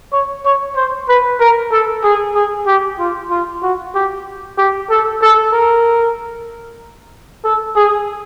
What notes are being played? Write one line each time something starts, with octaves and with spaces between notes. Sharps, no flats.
C#5
C#5
C5
B4
A#4
A4
G#4
G#4
G4
F4
F4
F#4
G4
G4
A4
A4
A#4
A4
G#4